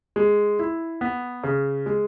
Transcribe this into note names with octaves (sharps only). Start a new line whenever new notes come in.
G#3
E4
B3
C#3
G#3